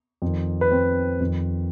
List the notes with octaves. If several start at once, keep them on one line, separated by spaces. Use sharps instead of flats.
F2 D#3
B4
C4 C5
F2 D#3